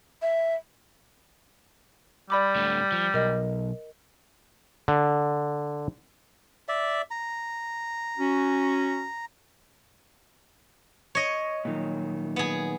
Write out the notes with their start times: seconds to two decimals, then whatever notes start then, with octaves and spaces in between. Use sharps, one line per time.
0.22 E5
2.30 G3 D5 B5 D6
2.56 A2 D3
2.92 F3
3.14 B1 A#4 D#5
4.88 D3
6.69 D5 E5
7.11 A#5
8.18 C#4 F#4
11.15 C#5 D#5
11.65 A#2 D#3 F#3
12.36 B3 G#4